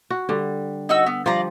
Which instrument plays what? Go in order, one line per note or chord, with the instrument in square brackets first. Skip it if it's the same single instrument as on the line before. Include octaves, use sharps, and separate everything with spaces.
[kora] F#4
D3 G3
[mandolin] D#4 F#4 E6
B3
[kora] F3 G3 [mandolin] F4 D5 A#5